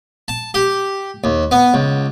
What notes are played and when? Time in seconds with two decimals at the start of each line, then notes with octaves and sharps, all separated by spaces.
0.28 A5
0.54 G4
1.24 D#2
1.51 B3
1.74 C#2